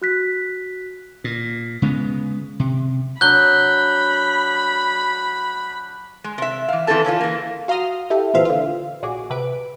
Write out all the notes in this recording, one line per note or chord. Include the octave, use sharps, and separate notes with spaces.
F#4 F#6 B6
A#2
C#3 G#3 A3 B3
C3
F#3 D4 B5 F#6 G6 G7
G#3
C3 E5
E3 F5
E2 E3 C4 G#4 A4 A5
C#3 C#4 D4 F4
E3 A#3
F#4 F5 A#5 C6 D#6 F6
E4 G4 A4
G1 A#2 E3 C4 E5 F5
D3 F4
A#1 F#4 G#4 D6
C3 B4 D7